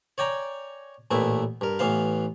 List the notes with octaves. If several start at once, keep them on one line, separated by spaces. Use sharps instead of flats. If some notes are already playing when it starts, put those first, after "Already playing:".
C#5 D5 G5 G#5 A#5
A1 A#2 A3 B3 E4
G2 A#4
A1 E3 B3 F5